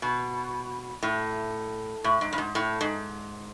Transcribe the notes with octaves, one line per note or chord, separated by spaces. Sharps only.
B2
A2
A2
G#2
G2
G#2
A2
G#2